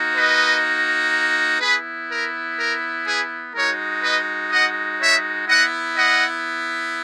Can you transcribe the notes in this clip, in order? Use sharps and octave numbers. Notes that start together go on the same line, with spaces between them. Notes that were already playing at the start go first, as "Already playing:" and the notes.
Already playing: A#3 D#4 F#4
B4 D#5
B3 E4 G#4 B4
A#4
A#4
G#4 B4
G#3 D#4 F#4 A#4 C#5
B4 D#5
D#5 F#5
C#5 E5
B3 E4 D#5 F#5
D#5 F#5